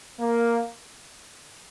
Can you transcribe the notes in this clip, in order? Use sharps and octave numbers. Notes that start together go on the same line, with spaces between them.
A#3